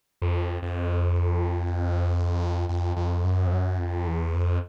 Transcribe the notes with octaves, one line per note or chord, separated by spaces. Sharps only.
F2
F2
F2
F2
F#2
F2
F#2
F2
E2
F2